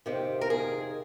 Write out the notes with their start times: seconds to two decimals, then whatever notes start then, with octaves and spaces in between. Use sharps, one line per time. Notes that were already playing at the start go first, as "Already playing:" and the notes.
0.06 F2 C3 D#3 G4
0.41 A#4
0.50 G#4